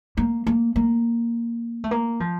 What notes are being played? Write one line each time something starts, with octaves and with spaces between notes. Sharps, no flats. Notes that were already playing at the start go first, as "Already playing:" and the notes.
A#3
A#3
A#3
A3
A#3
F3